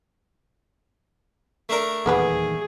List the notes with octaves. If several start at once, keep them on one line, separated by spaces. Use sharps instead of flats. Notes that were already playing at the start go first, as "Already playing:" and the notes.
A3 D4 A#4
D#1 E2 D#3 A#3 B3 G#4 B4